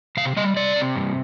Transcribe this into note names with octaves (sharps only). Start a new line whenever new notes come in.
C3 F5
G3 D#5
C3 D5
C3
G2